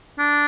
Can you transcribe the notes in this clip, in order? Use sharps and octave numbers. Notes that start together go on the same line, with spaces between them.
D4